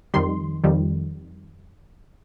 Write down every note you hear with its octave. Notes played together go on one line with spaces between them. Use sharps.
F2 D#3 G3 C6
F2 D#3 G3